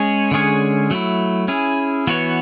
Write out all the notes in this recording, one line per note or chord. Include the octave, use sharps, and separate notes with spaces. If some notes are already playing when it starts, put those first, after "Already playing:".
Already playing: G#3 C#4 G#4 C#5
D3 G#3 C#4 G#4 C#5
F#3 A3 E4
C#4 E4 G#4
E3 B3 F#4 C#5